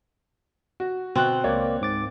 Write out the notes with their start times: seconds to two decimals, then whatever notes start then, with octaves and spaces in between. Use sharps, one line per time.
0.80 F#4
1.15 B2 C4 F#6
1.44 C#2 A#3 C#5 D5
1.81 G#2 D6 A6